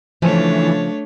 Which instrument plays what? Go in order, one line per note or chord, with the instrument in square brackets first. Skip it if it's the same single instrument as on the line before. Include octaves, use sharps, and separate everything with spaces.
[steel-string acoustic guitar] C#3 F3 [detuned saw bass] E3 [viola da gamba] A3 D4 C#5